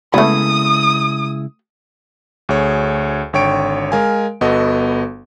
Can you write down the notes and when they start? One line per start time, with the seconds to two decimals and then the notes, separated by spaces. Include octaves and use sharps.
0.14 C#3 G#3 A3 B3 E4 D#6
2.49 D2 G#4 C#5
3.33 G#1 D3 C#5 G5 C#6 D7
3.92 G#3 A#4 F5 G#5
4.41 G1 B3 F#4 A4 D#5